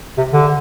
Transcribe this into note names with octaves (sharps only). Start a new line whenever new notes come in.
C3
D3